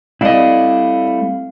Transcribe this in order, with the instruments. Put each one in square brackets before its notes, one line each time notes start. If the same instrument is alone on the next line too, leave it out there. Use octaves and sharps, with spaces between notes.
[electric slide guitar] G3 A3 E4 [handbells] C4 F5 [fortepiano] D5 D#5